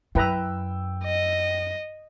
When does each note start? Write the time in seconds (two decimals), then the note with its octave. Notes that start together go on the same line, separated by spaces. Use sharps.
0.15 F#2 E4 B4 G5 A#5 E6
1.04 D#5